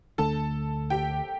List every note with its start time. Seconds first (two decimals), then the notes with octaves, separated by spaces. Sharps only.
0.18 D2 D3 A3 D4 A4 A5
0.90 G4 G5